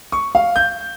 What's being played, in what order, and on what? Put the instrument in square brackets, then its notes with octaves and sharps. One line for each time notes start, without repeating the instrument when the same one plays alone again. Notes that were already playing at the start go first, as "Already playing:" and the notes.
[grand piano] C#6
F5
G6